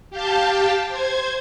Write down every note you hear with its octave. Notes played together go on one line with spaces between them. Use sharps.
G4 F5 G5 A5
C5 G#6